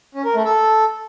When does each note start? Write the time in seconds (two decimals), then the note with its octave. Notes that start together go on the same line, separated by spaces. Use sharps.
0.15 C#4
0.25 A#4
0.35 A3
0.45 A4